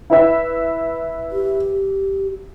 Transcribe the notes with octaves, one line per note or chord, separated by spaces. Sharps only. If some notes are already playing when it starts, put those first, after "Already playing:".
E4 B4 E5
G4